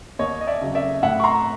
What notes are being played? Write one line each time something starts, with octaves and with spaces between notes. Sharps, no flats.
D#2 C#5 D#5
D#5
D5 E5
C#3 F#3
D5 E5
A2 E5 F#5
C#6
A#5 C6